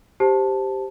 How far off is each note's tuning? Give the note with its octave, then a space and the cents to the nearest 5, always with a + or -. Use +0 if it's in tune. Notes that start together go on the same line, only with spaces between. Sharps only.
G4 +0 C5 +0 A5 +0